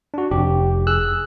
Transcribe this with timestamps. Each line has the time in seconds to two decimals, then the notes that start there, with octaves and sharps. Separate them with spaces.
0.14 D4 F#4
0.31 F1 G4
0.87 G#4 E6 F#6